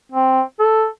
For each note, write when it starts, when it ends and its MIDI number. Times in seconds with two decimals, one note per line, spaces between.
0.12 0.42 60
0.59 0.87 69